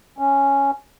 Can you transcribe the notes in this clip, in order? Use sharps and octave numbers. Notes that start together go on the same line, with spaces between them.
C#4